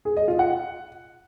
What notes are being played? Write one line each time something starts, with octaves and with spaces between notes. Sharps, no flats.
G#4
D#5
F4
F#5